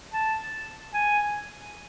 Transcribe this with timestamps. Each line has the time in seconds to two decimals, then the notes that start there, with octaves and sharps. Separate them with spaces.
0.13 A5
0.94 G#5